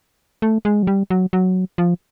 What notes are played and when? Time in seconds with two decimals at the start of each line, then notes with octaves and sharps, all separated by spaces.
0.42 A3
0.65 G#3
0.83 F#3
0.87 G3
1.10 F#3
1.33 F#3
1.78 F3